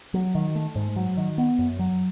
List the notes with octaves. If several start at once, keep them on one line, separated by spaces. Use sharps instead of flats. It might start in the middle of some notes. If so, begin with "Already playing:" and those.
F#3
D#3
A3
G#2
F#3
D#3
B3
F#2
F#3